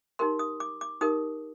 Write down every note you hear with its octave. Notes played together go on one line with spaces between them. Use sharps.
D#4 G4 A#4 C6
D#6
D6
D6
D#4 G4 A#4 D#6